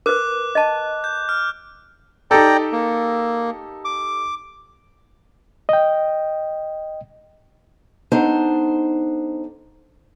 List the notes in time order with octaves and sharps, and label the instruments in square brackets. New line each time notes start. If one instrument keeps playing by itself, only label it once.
[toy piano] A#4 B4 [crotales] D6 F#6
[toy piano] D#5 A5
[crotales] G6
F6
[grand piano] D#4 G4 A4 [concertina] D5 G5 A#5
[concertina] A#3
D6
[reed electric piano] D#5 G5
[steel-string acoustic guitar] B3 D4 D#4 A4 C5